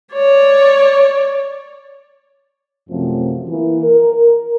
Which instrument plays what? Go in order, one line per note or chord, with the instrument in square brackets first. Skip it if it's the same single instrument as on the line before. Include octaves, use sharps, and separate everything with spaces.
[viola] C#5 D5
[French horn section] F#2 C3 F3 A3 C4
E3 A#3
A#4
A#4